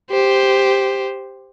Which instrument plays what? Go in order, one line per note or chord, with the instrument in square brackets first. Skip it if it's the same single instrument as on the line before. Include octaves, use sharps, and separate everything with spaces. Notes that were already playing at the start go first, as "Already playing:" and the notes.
[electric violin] G4 C5